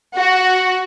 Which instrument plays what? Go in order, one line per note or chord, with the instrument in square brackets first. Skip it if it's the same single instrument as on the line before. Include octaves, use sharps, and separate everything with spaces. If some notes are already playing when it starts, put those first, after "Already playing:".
[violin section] F#4